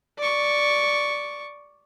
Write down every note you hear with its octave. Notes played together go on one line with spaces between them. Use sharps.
D5 C#6